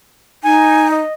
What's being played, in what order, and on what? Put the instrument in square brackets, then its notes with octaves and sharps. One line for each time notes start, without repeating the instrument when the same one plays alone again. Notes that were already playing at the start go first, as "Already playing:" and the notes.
[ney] D#4 [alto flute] G#5
[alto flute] D#5